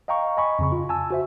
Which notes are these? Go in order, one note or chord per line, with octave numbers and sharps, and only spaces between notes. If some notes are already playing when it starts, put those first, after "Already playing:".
D#5 F5 G5 A#5 C#6
D#5 G#5 B5 C#6
F2 C#3 C#6
F4
G#5 A5 E6
F#4 C5 E5